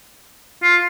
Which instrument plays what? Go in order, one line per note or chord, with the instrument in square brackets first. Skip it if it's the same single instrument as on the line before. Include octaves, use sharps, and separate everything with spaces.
[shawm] F4